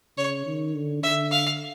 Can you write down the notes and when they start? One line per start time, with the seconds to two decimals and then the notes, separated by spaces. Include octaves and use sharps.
0.18 C#3 C#5
0.47 D#3
0.74 D3
1.03 D3 E5
1.31 F5